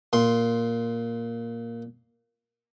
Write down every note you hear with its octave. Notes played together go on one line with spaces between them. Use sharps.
A#2 C6